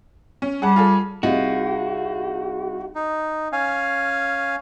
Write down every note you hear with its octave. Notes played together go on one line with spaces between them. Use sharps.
C#4
G3 G#4 F#5 A5
F4 G#4 A4
C2 D#4 F4 F#4 G#4
D#4
C#4 F5 G#5